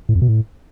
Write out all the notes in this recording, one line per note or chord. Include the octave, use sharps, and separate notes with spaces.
A2
F2
B2
A2